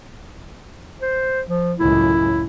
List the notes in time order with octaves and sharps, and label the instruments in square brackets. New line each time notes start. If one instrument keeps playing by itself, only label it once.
[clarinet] C5
F3
[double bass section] C#2 F#2 A2 [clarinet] E4